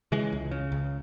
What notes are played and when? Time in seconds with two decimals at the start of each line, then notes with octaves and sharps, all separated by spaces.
0.12 C#3 E3 G#3
0.33 C#2
0.51 C#3
0.72 C#2